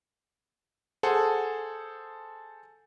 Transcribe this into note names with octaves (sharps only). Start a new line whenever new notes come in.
G#4 A4 C5 F#5